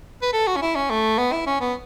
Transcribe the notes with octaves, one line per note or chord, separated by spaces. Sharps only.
B4
A4
F#4
C#4
E4
C#4
A3
B3
E4
C#4
B3